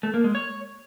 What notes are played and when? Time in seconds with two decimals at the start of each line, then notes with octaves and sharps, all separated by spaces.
0.03 A3
0.14 A#3
0.24 G#3
0.35 C#5